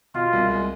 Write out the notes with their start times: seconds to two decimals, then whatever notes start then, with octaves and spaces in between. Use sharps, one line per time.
0.14 B2 F4
0.33 C2
0.49 G#3